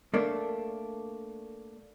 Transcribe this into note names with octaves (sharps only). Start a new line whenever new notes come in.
A3 A#3 D4